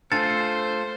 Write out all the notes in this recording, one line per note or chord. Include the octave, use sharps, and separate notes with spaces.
A3 D4 F4 A4 C5 G#5 A6